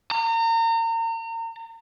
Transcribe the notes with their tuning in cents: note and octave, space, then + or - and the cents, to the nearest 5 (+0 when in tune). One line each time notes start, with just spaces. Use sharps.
A#5 -35